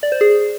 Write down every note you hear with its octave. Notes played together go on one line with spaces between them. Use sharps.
D5
C5
G#4